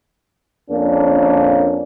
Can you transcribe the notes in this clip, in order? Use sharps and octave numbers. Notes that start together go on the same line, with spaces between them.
F2 A#3 C#4 D4